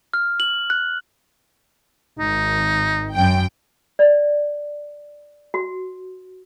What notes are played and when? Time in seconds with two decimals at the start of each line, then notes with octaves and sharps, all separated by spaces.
0.14 F6
0.40 F#7
0.70 F#6
2.19 G#1 D#4
3.13 F#2 G5
3.99 D5
5.54 F#4